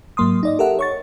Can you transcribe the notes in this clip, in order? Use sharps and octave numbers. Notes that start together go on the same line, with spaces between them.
G#2 F#3 A#3 C6 D#6
D#4 D5 D#5
G4 A4 A#4 E5 F#5
C#5 C#6 A6